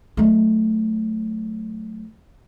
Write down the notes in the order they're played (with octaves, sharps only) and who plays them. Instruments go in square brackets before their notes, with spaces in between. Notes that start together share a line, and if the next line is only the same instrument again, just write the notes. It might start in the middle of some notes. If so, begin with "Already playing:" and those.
[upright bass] F#3 A3